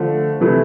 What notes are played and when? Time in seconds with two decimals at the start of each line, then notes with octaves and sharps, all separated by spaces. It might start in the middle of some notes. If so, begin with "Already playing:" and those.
Already playing: D3 F3 A3
0.40 C3 E3 A3 E4